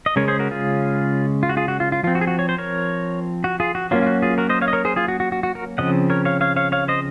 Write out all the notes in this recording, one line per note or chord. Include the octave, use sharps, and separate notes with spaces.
D#5
C#3 G#3 C#4 A#4 C#5
G#4 C5
F#4 A#4
F4 G#4
F4
F#4
F4 G#4
F#4
F4
F4
F3 C4 F4
F#4
G#4
F#4
C#5
C5
A#4 C#5
F#4
F4 G#4
F#4
F#3 A#3 C#4 F4
F4
F#4
F4 G#4
F#4 A#4
C5 D#5
C#5 F5
D#5
A#4 C#5
G#4 C5
F4 G#4
F#4
F#4
F#4
F#4
F#4 A#4
C#3 F3 C4 D#5 F#5
A#4 C#5
C#5 F5
C#5 F5
C#5 F5
C#5 F5
C5 D#5